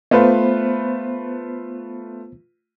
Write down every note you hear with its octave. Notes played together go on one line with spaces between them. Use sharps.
A3 B3 F4 B4 C5